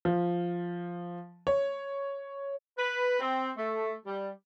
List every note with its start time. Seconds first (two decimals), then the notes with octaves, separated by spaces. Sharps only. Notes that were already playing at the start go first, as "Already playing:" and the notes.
0.05 F3
1.47 C#5
2.77 B4
3.20 C4
3.57 A3
4.05 G3